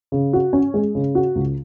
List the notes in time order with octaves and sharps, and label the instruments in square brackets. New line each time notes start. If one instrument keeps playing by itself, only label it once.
[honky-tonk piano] C#3
F#4
C#4
G#3
C#3
F#4
C#2